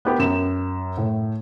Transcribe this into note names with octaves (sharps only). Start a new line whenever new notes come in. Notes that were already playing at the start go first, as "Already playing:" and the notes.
B3 G4 A#4 B4
F#2 E7
A2